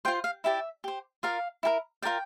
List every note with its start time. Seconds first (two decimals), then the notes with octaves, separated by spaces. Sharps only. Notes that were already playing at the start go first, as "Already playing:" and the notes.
0.05 F4 C5 G5
0.24 F5
0.44 E4 G4 D5 E5
0.84 G4 C5
1.23 F4 A#4 D5 F5
1.63 E4 G4 A#4
2.02 F4 A#4 D5 G5